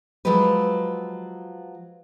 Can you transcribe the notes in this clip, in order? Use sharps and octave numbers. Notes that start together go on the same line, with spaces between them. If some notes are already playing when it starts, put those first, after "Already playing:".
F3 F#3 G#3 G4 B4